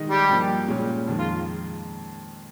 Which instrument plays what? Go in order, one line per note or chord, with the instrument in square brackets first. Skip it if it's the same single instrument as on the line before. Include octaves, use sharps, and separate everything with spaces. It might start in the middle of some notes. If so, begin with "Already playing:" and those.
Already playing: [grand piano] D#3 G#3 D#4
[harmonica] G3 G4
[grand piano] G2 F3 A#3
A#2 G#3 C#4 F4
F2 D#3 G#3
[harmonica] F4